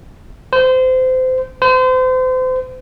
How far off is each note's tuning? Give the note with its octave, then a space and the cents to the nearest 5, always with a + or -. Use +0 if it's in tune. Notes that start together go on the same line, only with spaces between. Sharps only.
C5 -25
C5 -35